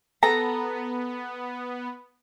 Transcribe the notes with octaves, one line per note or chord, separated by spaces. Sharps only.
B3 A4 A#5